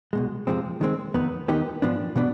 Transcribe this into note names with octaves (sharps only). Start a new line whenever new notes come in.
C2 B2 G#3
F2 C3 F3 G#3 C4
D#3 G#3 C4
F2 D#3 B3 D#4
D#2 D#3 B3 D#4 G4
G#2 F3 B3 D4
B2 B3 D4